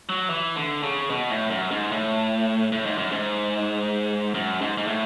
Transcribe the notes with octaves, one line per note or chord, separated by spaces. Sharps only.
F#3
E3
D3
C#3
B2
A2
F#2
G#2
A2
A2
G#2
F#2
G#2
F#2
G#2
G#2
A2